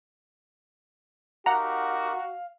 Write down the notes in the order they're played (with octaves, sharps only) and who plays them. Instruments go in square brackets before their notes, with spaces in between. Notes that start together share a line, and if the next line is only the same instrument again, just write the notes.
[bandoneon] D#4 G4 A#4 [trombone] F#4 [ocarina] F5 [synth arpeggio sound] F#5 A#5